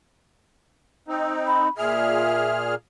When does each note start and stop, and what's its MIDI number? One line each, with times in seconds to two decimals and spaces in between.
1.08 1.69 60
1.08 1.69 63
1.47 1.67 83
1.78 2.75 46
1.78 2.75 68
1.78 2.56 76
1.78 2.75 89